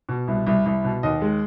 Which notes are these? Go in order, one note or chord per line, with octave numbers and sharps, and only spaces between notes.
B2
C2
C2
C2
B2
D#2 D#5
G#3